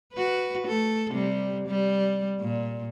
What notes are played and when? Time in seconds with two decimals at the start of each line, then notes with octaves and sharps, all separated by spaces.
0.13 F#4 B4
0.67 A3 A4
1.12 C3 G3
1.68 G3
2.40 A#2